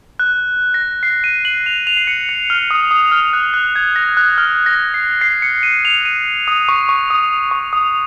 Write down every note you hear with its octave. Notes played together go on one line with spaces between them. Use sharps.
F#6
A#6
C7
D#7
F#7
F7
F7
C7
C#7
C#7
F6
D#6
D#6
F6
F#6
F#6
G#6
A#6
F#6
F6
A#6
C7
C7
C#7
D#7
F7
D#7
D#6
C#6
C#6
D#6
C#6
D#6